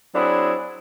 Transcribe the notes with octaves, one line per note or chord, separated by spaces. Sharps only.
F#3 C4 D4 E4 G#4